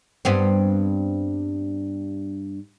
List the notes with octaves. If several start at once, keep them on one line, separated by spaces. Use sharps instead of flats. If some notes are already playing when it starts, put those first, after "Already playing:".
G2 B3 C4